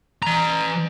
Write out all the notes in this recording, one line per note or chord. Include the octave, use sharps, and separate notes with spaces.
E3 A#5